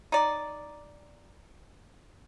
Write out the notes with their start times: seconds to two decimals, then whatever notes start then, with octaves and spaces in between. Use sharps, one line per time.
0.12 D#4 D5